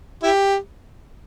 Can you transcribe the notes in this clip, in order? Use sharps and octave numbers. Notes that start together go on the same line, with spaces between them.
E4 G4